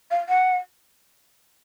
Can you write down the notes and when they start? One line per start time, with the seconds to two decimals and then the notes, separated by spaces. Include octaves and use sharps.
0.11 F5
0.29 F#5